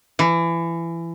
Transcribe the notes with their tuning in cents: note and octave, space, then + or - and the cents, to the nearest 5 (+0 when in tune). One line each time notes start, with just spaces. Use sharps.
E3 +25